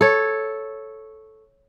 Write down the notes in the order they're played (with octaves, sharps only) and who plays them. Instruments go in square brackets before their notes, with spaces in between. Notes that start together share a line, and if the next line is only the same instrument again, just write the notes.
[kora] A4 C#5